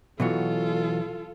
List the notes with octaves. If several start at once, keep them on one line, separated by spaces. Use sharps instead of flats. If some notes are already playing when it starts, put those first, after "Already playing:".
B2 E3 F#3 F4 A4